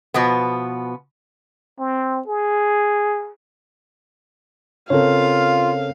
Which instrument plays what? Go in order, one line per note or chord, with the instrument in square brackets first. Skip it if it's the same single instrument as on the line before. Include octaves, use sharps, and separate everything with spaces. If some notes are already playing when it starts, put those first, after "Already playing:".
[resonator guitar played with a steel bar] B2 F3 B3
[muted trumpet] C4
G#4
[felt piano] C#3 C4 A#4 [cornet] F4 [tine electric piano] A4 C#5 [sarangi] F5